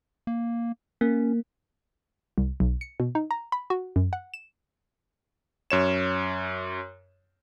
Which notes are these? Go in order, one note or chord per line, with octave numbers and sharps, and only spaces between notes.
A#3
A#3 C#4
C2
B1
C#7
B2
D#4
A#5
B5
F#4
F#2
F#5
E7
F#2 C#5 E7